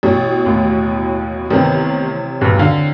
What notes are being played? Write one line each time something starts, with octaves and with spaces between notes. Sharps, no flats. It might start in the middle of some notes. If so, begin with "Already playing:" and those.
A1 B2
D#2 A2
A1 C3 D#3 B3 C4
B1 E2 G2
D3 F5